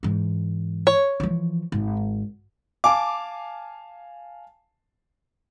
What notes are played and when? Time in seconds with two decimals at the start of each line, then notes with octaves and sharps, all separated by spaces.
0.03 G#2 E3
0.87 C#5
1.20 E3 F3
1.72 G#1
2.84 F5 G#5 A5 D6